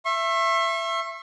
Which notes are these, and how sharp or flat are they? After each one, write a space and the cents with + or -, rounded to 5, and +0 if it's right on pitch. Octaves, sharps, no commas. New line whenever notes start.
E5 +20 C#6 -40